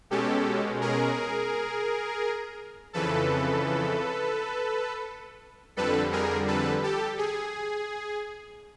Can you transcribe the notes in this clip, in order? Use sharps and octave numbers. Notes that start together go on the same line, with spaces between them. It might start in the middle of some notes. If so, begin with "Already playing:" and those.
B2 G#3 C#4 G4 A4
G#4 A#4
F2 C#3 E3 A4 B4
F2 D3 G3 A4 B4
G#4 A#4
A4 B4
G4 A4
G#4